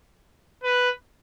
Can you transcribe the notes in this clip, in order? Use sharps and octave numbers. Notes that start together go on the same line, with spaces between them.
B4